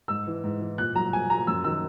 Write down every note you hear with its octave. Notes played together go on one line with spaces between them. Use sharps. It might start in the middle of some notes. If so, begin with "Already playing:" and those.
G#2 E6
E3
G#2
E3
A#2 F#6
F#3 A#5
A#2 G#5
F#3 A#5
F#2 E6
D#3 F#3 E6